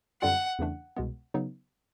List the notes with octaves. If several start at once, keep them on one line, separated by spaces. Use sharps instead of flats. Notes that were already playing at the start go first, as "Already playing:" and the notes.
F#2 D3 G3 C4 F4 F#5
E2 C#3 E3 A3 D4
C2 B2 G#3 B3
C#3 F#3 B3 D#4